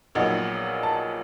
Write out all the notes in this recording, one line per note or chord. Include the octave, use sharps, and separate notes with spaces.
A#1 A#2 F#3 B3 D#4
A5